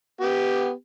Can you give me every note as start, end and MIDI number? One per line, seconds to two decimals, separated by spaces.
0.21 0.71 59
0.21 0.71 67